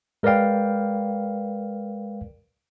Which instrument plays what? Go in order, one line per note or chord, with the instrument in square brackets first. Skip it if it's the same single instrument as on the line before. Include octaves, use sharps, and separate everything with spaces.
[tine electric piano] G#3 A#4 B4 D5 F5 G5